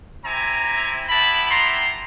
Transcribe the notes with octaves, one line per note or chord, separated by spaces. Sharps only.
C4 E4 G4 G#5 A#5
B3 E4 G4 A5 B5
A#5 C6